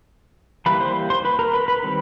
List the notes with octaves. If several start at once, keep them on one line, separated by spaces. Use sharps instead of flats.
E3 G3 A#3 B4 B5
C5 C6
C5 C6
B4 B5
A#4 A#5
B4 B5
B4 B5
D#3 G3 C4